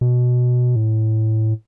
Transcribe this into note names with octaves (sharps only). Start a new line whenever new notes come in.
B2
A2